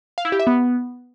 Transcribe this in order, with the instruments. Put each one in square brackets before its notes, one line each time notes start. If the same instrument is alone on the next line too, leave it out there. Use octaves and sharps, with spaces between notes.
[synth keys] F5
E4
G4
E5
B3